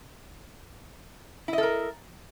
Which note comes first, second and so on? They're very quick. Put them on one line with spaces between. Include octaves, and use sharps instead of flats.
E4 D#5 A4 A#4